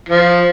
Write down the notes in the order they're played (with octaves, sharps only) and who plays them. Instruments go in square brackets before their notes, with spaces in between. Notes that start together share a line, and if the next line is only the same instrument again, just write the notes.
[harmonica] F3